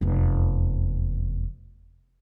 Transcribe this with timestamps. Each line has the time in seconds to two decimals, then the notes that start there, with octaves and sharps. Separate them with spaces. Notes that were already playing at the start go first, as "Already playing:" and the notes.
0.01 F1 E2